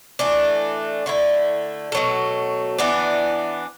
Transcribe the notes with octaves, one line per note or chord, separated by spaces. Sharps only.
E3 A3 D4
D3 A3 E4
B2 F#3 A3
E3 B3 D4